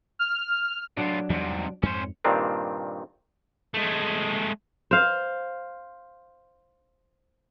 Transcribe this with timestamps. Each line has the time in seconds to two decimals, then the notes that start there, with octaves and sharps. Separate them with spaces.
0.19 F6
0.97 A2 F#3 D4 F4
1.30 E2 G#2 C3 E3 G3
1.83 F2 G#2 C#4 C5
2.24 G2 A#2 D#3 C4 D4
3.74 G#3 A3
4.91 C5 F5